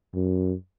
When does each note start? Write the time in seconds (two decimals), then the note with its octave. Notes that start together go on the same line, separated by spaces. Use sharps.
0.14 F#2